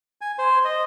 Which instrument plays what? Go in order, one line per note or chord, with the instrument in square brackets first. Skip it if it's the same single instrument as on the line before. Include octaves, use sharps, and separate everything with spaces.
[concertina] G#5
C5
D#5